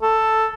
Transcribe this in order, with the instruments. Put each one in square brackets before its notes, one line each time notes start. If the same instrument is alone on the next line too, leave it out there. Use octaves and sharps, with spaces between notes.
[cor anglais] A4